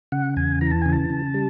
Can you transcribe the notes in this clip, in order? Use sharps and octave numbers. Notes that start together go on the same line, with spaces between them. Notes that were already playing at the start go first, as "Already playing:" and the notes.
C#3 F#5
E2 G#5
E3 A#5
A5
C#3 G#5
A5
C#3
G3